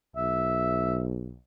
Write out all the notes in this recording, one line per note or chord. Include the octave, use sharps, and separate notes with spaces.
B1 E5